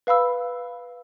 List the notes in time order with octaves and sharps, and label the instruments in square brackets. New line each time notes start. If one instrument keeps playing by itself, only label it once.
[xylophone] B4 F5 B5 E6